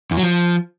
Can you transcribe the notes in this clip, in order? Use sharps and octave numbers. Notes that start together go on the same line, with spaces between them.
E2
F#3
F3